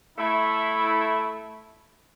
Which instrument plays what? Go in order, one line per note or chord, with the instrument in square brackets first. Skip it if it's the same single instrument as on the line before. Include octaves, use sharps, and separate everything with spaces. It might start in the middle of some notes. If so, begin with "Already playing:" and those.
[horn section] A3 E4